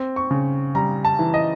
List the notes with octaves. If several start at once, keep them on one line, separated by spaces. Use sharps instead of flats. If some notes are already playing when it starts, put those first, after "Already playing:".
Already playing: C4
C#6
C#3
G3 A#5
A5
E3
D#5